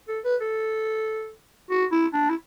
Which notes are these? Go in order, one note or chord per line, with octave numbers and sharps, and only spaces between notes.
A4
B4
A4
F#4
E4
D4
E4